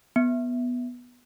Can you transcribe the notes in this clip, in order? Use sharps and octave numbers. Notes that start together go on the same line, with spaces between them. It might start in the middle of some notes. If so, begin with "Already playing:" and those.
B3